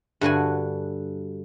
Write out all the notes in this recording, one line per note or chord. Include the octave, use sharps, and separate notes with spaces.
G2 D3 F#4 G#5